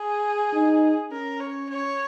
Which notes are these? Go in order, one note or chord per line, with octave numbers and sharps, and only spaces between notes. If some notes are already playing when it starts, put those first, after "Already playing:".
Already playing: G#4
D#4
C#4 A#4
C#5
C#5